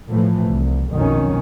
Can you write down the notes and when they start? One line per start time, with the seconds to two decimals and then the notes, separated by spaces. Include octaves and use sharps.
0.10 A2 E3 F3 A3
0.48 C2
0.91 B1 F2 B2 D#3 F#3 C#4